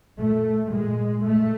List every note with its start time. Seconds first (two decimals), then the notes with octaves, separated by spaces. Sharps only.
0.18 A#2 A3
0.71 A#2 G#3
1.23 A#2 A3